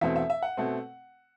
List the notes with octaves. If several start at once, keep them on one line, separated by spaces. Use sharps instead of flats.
E2 B2 A3 C4 E5
E5
E5
F#5
B2 A3 C4